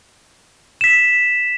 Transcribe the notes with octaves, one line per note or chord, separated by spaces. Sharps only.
B6 E7